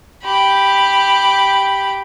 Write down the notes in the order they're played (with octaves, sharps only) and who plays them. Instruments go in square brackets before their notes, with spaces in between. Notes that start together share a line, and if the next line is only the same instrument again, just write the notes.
[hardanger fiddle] G4 B5